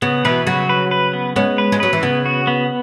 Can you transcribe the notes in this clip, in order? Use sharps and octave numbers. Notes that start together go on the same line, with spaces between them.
C#3 B3
B2 E3 B4
C#3 F#3 F#4
B4
B4
B3
G#3 B3 C#4
B4
G#3
F#3 B4
E3
C#3 B3
F#4
B3